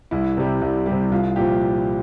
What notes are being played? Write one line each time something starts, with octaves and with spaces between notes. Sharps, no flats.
C2 E4
C3 G3
C2
C3 G3
C2 F4
A#2 F3 G4